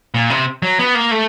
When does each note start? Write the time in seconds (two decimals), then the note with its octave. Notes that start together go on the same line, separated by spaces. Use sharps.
0.15 A#2
0.30 C3
0.63 F#3
0.79 B3
0.95 A#3
1.11 A3